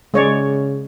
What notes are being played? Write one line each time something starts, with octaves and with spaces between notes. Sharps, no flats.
C#3 G#3 C#5 D5